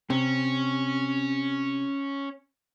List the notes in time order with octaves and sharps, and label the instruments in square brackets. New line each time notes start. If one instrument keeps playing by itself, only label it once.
[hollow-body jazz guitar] C3 [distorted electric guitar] C#4